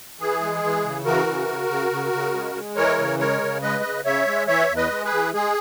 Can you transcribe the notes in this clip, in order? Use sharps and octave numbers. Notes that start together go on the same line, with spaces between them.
E3 G#4
G#3
E3
C#3
E3 F#4 A#4
C#3
C#3
C#3
C#3
C#3
G#3
G#3
E3 A#4 C#5
C#3
G#3 A#4 C#5
C#3
G#3 B4 D#5
C#3
C#3 C#5 E5
G#3
E3 C#5 E5
E2
B4 D#5
G#3
G#4 B4
E3
G#3 G#4